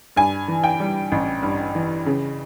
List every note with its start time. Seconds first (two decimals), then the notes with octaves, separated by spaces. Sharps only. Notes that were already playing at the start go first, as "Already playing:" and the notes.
0.16 G2 G#5
0.48 E3
0.64 G5
0.80 G3
1.12 A1
1.43 G2
1.75 E3
2.06 C#3